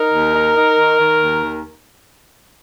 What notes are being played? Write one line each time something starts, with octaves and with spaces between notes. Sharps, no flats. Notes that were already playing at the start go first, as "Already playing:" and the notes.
Already playing: D#4 A#4
D#2
D#4
D#4
D#3
D#3
D#2
D#3